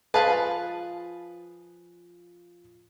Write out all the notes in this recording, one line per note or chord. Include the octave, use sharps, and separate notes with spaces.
F3 G#4 B4 F5 A5